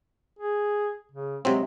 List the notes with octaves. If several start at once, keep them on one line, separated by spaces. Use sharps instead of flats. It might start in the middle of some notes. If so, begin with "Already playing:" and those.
G#4
C#3
C3 F#3 G#3 C4